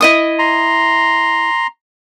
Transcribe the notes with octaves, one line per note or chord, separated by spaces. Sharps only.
E4 D#5 D#6
A#5 C6